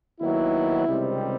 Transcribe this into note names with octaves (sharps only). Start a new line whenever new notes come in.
D#2 D#3 F#3 B3 E4
C#2 C3 D#3 G3 C4